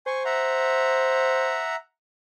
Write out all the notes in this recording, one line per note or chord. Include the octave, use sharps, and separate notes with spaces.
C5 G#5 C#6
E5 F#5 A#5